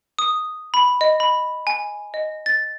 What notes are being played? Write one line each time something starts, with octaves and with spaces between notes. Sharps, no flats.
D#6
B5
D#5
B5
G#5
D#5
A6